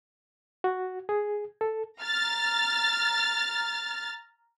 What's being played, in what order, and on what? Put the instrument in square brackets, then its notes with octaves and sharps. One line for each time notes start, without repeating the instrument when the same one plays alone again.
[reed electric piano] F#4
G#4
A4
[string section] A#5 F6 A6